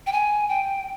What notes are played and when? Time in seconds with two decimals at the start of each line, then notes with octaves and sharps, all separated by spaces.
0.07 G5
0.12 G#5
0.49 G5